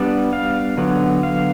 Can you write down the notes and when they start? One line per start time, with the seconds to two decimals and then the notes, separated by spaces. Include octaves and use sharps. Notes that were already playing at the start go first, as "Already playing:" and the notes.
Already playing: G3 B3 D4
0.33 F5
0.78 D3 F#3 B3
1.23 F5